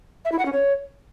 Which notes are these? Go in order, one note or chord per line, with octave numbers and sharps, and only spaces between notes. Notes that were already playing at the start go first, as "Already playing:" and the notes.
E5
E4
F#5
C#4
C#5